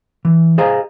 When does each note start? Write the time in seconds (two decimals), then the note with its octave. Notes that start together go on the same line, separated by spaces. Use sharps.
0.25 E3
0.58 G#4 C5 D#5 F5 G#5 A#5